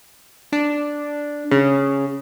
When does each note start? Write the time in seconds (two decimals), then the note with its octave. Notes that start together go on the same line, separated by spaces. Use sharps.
0.53 D4
1.51 C#3